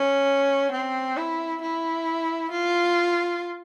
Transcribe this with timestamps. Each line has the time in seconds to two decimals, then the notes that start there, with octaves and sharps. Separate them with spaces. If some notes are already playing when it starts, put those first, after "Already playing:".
Already playing: C#4
0.72 C4
1.17 E4
1.62 E4
2.51 F4